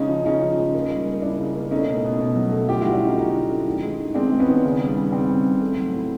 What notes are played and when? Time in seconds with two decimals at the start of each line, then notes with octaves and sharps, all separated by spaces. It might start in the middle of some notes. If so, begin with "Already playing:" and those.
Already playing: C#3 G#3 C#4 D#4
0.08 F3
0.25 C#3 C#4 D#4
0.42 F3
0.58 G#3
0.74 A#3
0.90 G3
1.06 A#3
1.22 C#3 D4 E4
1.38 C#3
1.55 A#3
1.71 A3 C#4 D#4
1.88 B2
2.04 B2
2.20 B2
2.36 F#3
2.52 A3
2.69 D3 F4 G4
2.81 F#3 E4 F#4
2.93 D4 E4
3.02 F#3 C#4 D#4
3.18 D3 C#4 D#4
3.34 D3
3.50 A3
3.66 D#3
3.82 G#3
3.98 D#3
4.15 G#3 C4 D4
4.32 G#3
4.39 B3 C#4
4.48 D#3
4.63 C#3
4.81 G3
4.96 C#3
5.12 G3 C4
5.29 C#3
5.45 C#3
5.62 A3
5.77 F#3
5.93 A2